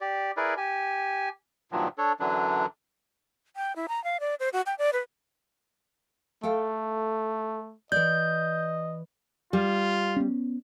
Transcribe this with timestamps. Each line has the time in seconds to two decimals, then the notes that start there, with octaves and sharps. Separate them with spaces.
0.01 G4 D5
0.37 E4 G#4 A#4 B4 D5
0.57 G4 G#5
1.72 G2 A#2 D#3 F3 F#3
1.98 D4 A4 C#5
2.20 F#2 D3 E3 F#3 D4
3.56 G5
3.76 E4
3.88 A#5
4.04 F5
4.20 D5
4.40 C5
4.53 F#4
4.66 G5
4.79 D5
4.93 B4
6.43 A3 A4 F5 G5
7.92 E3 D5 D#5 G6
9.53 G3 F4
10.16 B3 C#4